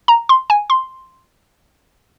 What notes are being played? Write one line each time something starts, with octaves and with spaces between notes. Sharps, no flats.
A#5
C6
G#5
C6